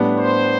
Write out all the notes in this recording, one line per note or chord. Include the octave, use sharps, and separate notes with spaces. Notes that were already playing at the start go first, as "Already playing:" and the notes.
Already playing: A2 G3 B3 D4
C5